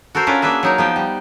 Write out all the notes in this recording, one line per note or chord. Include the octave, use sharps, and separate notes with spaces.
F#4 A4 A#4 C5
C#4 D4 F4 F#4 A#4 B4
A#3 D4 G#4 B4 E5
F#3 D#4 A#4
F3 B3 G5
G3